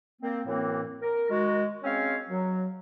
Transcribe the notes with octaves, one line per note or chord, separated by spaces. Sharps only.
A#3 C4
F#2 A2 E3 A#3 C4
A#4
D#3 G#3 F#4
G#3 C4 C#4 C#5 F5
F#3